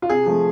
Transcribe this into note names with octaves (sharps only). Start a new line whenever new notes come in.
F4
C3 G#4
F3 A3